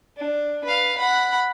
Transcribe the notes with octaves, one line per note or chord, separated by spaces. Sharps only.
D4
B4 F5
F#5 B5